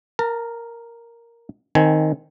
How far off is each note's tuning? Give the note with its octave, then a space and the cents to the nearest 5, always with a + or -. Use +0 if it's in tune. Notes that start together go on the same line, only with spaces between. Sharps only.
A#4 +0 A5 +35
D#3 +0 C4 +0 G#5 +15